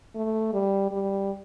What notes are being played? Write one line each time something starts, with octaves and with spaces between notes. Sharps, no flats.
A3
G3
G3